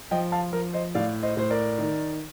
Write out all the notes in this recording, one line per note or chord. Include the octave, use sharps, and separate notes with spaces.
F3 D#5 G5
F5 A5
F3 A#4
C5 D#5
A2 D5 F5
C5 D#5
A2 C5
A#4 D5
D#3